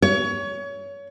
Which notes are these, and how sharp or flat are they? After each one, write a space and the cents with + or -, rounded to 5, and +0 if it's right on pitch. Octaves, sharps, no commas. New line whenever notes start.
C#5 +25